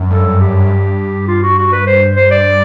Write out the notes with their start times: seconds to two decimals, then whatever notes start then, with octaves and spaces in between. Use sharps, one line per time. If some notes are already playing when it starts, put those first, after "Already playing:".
Already playing: F#2
0.10 G2 A4
0.40 G4
0.59 F#2
0.69 G2
1.28 F4
1.43 F#4
1.58 F#4
1.73 B4
1.87 C5
2.16 C5
2.31 D5